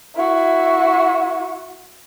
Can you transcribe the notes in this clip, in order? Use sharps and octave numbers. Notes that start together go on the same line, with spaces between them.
E4 F#4